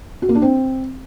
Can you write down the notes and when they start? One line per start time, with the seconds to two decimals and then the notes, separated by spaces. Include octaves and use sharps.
0.22 F#4
0.29 A#3
0.35 D4
0.42 C4